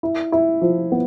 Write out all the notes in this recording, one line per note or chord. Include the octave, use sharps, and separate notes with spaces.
E4
E4
F3
B3